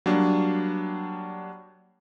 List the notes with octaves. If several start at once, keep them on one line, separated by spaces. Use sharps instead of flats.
F#3 G3 A#3 D4